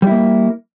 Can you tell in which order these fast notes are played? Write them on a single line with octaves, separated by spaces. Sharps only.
G3 E4 A#3